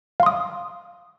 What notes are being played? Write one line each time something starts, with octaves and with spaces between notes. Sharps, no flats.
F5 C6 D#6